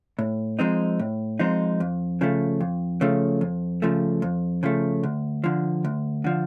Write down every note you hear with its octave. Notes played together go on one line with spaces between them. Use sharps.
A2
F3 G#3 C4 D#4
A2
F3 G#3 C4 D#4
F2
C#3 F3 A3
F2
C#3 F3 A3
F2
C#3 F3 A3
F2
C#3 F3 A3
D2
D3 F3
D2
D3 F3